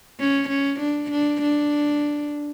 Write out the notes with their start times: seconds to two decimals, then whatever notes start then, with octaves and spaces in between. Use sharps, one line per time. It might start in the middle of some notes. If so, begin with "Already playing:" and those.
0.19 C#4
0.49 C#4
0.80 D4
1.11 D4
1.42 D4